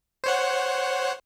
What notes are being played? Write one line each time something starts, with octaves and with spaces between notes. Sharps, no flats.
C5 C#5 F#5